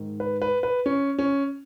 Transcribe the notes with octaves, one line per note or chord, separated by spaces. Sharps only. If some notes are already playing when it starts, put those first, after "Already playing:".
Already playing: G#2 D#3
B4
B4
B4
C#4
C#4